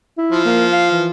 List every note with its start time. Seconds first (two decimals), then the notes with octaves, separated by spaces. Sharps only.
0.18 E4
0.32 F3
0.46 A#3
0.73 F5
0.91 E3